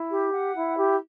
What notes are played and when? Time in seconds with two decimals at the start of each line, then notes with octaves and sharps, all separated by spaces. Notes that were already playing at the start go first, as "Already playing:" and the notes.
Already playing: E4
0.10 G4
0.33 F#5
0.54 E4
0.76 G4